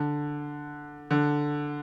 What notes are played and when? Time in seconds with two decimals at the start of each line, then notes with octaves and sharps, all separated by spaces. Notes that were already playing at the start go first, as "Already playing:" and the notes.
Already playing: D3
1.11 D3